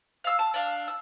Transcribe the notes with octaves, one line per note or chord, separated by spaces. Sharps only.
F5 E6
A5
D4 F5
E6